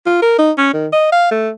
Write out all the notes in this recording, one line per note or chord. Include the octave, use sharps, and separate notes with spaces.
F4
A#4
D#4
C#4
D#3
D#5
F5
A3